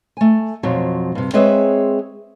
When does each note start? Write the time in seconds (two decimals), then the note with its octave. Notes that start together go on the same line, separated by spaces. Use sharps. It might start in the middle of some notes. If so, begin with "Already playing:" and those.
0.17 A3 G#5
0.63 F2 B2 F3 F#3
1.15 G2 C3
1.33 G#3 C4 G#4 B4 C#5 E5